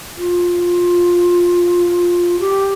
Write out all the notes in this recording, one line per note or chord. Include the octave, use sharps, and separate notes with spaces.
F4
G4